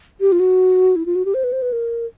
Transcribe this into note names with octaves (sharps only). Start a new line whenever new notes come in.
G4
F4
F#4
E4
F4
F#4
G4
C5
B4
C5
B4
A#4